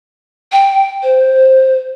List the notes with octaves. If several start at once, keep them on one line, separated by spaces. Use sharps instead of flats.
G5
C5